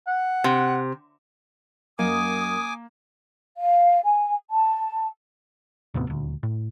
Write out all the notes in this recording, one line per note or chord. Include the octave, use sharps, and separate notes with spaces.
F#5
C3
F#2 F#3 A#3 D#5 G#5 D6 D#6
F5
G#5
A5
D#2 A2 C3 B3
D#1 D2
A2